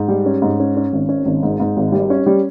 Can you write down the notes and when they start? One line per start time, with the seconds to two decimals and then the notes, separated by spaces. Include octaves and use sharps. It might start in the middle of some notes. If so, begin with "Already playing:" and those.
Already playing: G#2
0.08 G3
0.26 C#4
0.42 G#2
0.60 C#4
0.76 C#4
0.93 G#1
1.09 C#4
1.25 G#1
1.43 G#2
1.60 G#2
1.77 G#1
1.92 G3
2.10 C#4
2.26 G3